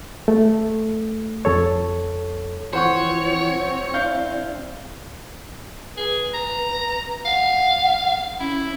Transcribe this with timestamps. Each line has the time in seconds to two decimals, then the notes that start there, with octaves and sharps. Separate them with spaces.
0.28 A3
1.45 F2 A4 C#5
2.73 E3 F3 C4 C5 C#5 F#5 C#6
3.94 D4 E4 F5 G6
5.97 G#4 B4
6.34 A#5
7.25 F5 F#5
8.40 C#4 E4